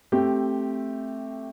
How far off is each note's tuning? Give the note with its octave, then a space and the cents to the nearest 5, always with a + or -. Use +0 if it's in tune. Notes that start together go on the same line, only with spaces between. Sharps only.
A3 +0 C4 +10 G4 -5